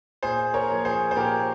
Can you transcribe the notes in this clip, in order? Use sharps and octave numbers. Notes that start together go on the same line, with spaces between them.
A#2 G#4 C5
A#4 C#5
F3 A#3
G#4 C5
C5
A#2 G4 A#4